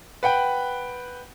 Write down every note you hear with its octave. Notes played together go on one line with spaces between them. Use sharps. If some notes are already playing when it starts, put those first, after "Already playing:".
B4 F#5 G5